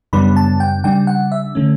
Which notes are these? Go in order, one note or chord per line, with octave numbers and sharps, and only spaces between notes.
F#2 C#3 G3 B3 D4 B5
A5
G5
C#3 G3 D4 G5
F#5
E5
D3 A3 C#4